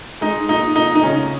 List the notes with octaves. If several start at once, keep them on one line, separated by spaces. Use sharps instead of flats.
G#3 D#4
A#2 D#4
A#2 D#4
D#4
C#3 C#4